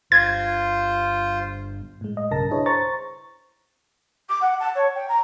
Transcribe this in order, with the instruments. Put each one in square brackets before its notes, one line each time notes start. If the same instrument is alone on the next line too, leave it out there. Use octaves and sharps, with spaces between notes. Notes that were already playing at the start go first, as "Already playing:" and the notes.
[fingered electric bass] G1 [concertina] F4 C5 [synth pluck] G#6
[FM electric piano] A2 G#3
D#5
B1 G2 C#3 A#4 A5 A#6
D4 E4 G#4 B4 C#5 D#5
C5 A#5 C#6 A6
[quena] D6
F#5
A5
C#5
G5
A#5